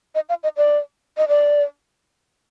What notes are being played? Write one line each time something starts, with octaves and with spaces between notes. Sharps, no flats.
D#5
F5
D#5
D5
D#5
D5